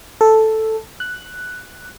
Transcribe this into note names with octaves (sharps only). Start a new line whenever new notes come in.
A4
F#6